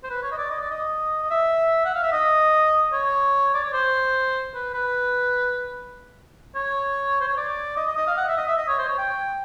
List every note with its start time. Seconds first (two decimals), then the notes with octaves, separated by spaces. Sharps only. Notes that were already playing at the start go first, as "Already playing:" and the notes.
0.04 C5
0.10 B4
0.23 C#5
0.32 D#5
0.37 D5
0.50 D#5
0.61 D5
0.70 D#5
1.23 D#5
1.30 E5
1.85 F#5
1.95 F5
2.03 E5
2.12 D#5
2.93 C#5
3.55 D5
3.64 C#5
3.73 C5
4.55 B4
4.74 B4
6.55 C#5
7.21 C5
7.28 C#5
7.37 D5
7.77 D#5
7.87 D#5
7.97 D#5
8.07 F5
8.17 F#5
8.27 E5
8.37 D#5
8.48 E5
8.57 D#5
8.68 C#5
8.78 C5
8.88 C#5
8.98 G5